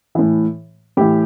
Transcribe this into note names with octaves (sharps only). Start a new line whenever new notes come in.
A2 E3
A2 E3 G4